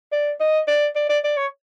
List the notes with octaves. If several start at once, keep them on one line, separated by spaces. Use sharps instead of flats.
D5
D#5
D5
D5
D5
D5
C#5